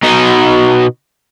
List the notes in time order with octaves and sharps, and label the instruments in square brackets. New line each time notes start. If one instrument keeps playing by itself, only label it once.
[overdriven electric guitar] B2 D#4